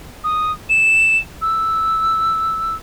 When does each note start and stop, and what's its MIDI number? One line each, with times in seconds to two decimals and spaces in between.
0.24 0.52 87
0.69 1.18 100
1.42 2.75 88